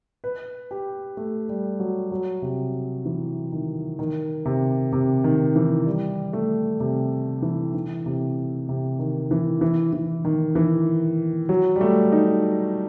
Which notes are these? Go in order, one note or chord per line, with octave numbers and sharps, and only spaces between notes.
B4
G4
A3
G3
F#3
F#3
C3
E3
D#3
D#3
C3
C3
D#3
E3
G3
A3
C3
E3
E3
C3
C3
D#3
E3
E3
E3
D#3
E3
F#3
G3
A3
D#4